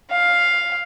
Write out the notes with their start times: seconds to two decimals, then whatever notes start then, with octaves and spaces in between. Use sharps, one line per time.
0.11 F5